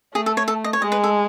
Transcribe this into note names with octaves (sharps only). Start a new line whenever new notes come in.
A3 G#4
A4
C#5
A4
D#5
C#5
G#3 D#5
B4
A4